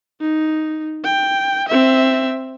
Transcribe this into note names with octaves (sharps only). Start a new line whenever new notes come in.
D#4
G5
C4 E5